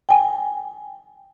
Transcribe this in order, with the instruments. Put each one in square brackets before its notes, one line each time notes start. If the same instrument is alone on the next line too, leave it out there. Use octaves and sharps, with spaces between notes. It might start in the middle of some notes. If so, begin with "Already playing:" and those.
[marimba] G5 G#5